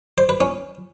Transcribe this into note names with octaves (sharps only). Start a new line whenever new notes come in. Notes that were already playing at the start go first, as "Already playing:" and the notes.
C5
B4
C#4